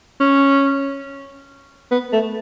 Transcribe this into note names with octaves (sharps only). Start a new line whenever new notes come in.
C#4
B3
A3